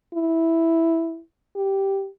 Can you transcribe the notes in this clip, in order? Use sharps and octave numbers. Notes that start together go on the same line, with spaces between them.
E4
G4